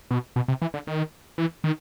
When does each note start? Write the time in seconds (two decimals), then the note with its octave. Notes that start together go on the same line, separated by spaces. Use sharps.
0.11 B2
0.36 B2
0.48 C3
0.62 E3
0.74 D3
0.87 D#3
1.38 E3
1.64 D#3